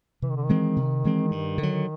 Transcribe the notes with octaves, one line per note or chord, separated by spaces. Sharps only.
C3 E3
D#3
D3
D#3
E3 G#3 C4
C3
E3 G#3 C4
G2
D3
F#3